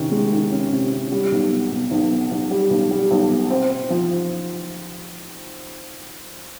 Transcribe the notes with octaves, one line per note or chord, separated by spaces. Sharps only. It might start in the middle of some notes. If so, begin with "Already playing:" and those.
Already playing: C3 D#3 C#4
G#3
D#3
C#4
C3
C#4
G3
B1
B2
B2
B1
B2
B1
G3
B1
G3
B1
B2
C4
C4
F3